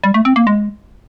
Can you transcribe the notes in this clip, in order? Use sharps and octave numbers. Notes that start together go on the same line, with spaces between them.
G3
A3
C4
A#3
G#3